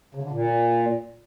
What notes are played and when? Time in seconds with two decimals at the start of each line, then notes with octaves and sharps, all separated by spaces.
0.15 C#3
0.23 D3
0.31 A#2